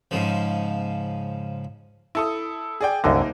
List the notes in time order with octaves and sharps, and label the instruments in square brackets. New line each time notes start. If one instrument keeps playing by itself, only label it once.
[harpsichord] G#2 C#3 F3
[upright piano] E4 A4 D#6
G#4 D5 G5
[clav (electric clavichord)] C2 F#2 D3 [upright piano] A#3 D#4